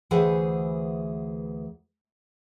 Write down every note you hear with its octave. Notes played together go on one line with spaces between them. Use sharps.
D2 E3 G#4 B4 C5 F#5